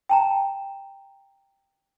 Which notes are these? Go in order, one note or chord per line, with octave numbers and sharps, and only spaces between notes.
G5 A5 A#5